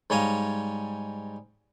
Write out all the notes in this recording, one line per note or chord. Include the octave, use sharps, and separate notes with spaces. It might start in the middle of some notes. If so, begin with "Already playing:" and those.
G#2 G3 C#5 D#5 F5